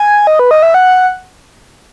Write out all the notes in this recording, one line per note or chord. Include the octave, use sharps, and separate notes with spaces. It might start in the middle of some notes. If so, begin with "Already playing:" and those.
Already playing: G#5
D#5
B4
D#5
E5
F#5